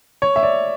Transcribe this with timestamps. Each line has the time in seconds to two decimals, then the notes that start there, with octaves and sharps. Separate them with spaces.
0.22 C#5
0.36 E5
0.43 D5